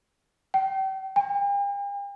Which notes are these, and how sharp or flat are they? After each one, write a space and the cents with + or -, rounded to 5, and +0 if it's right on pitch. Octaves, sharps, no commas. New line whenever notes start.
G5 -35
G5 +45